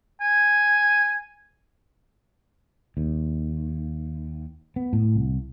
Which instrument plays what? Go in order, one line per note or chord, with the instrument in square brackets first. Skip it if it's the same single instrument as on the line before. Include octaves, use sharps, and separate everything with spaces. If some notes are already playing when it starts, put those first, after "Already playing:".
[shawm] G#5
[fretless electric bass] D#2
B3
A2
C2